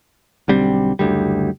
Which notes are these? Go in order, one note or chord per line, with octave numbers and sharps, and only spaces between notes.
B1 D3 G3 C4
F#1 D2 D3 G3